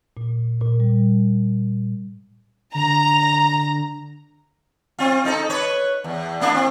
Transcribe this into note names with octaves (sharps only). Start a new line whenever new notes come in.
A#2
A#2
G3
D3 A#5
C4 F4
D#4 A4
B4 C#5
E2
A#3 D4 E4
C4